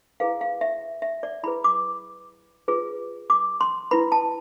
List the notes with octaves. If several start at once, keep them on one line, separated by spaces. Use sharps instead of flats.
E4 G#4 B4 F5
F5
E5
E5
D5
E4 G#4 B4 B5
D6
F4 G#4 B4
D6
C6
E4 B4 B5
A5